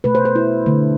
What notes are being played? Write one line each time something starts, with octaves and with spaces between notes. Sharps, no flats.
B2 A3 B4
C5
C5
E4
D3 A3